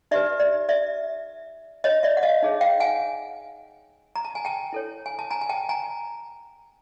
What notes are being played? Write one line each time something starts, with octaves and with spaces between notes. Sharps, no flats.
D#4 G4 B4 D5 E5
D5
D5 E5
C#5 D#5
D5 E5
F#5
D#5 F5
D#4 G#4 C#5
F5 G5
F#5 G#5
A#5
A5
G#5
G5 A5
E4 A4 C#5
G#5
A5
G#5 A#5
G#5
G5 A5
G#5 A#5